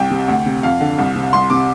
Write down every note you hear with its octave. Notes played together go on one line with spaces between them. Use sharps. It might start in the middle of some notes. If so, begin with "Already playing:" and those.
Already playing: C2 G5
C3
D2
C3
F2 F5
D3
C2
C3
C2 C6
C3 D6